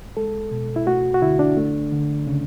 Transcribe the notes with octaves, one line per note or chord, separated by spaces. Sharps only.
G#3 A4
B2
E4
A3 F#4
F#4
D3 E4
D4
A3
D3
C#3